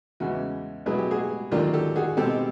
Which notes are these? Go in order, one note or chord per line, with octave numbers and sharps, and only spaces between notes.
E2 C#3 E3 G#3 F#4
B2 F#3 B3 E4 G#4
G4
F#4 G#4
D#2 D3 F#3 A#3 D4 F4 G4
G4 A4
F#4 G#4
B2 G#3 C4 G4 A4